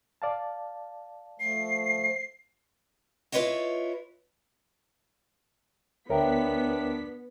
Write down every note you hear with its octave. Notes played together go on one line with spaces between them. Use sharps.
D5 F5 A5
F3 A3 C7
E4 F4 B4 C#5 D#5 F#5
D2 B3 D4 A#4 C#5 E5 G5 B6